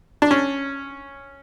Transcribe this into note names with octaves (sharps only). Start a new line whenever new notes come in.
D4
C#4